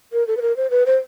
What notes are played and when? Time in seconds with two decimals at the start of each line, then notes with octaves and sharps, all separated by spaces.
0.13 A#4
0.27 A4
0.37 B4
0.42 A#4
0.57 C5
0.70 B4
0.86 C5